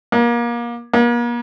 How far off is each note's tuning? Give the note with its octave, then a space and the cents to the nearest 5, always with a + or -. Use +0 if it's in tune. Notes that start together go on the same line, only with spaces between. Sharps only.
A#3 +30
A#3 +40